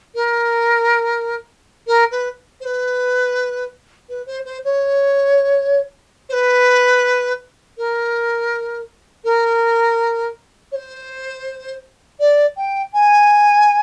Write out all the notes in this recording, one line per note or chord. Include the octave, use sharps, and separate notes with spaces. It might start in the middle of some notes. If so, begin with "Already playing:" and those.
A#4
A#4
B4
C5
B4
B4
C5
C5
C#5
C5
B4
A#4
A#4
C#5
C5
D5
G5
G#5